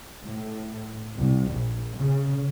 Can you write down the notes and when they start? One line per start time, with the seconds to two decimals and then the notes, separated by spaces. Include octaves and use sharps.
0.24 A2
1.15 C2
1.48 A#1
1.99 C#3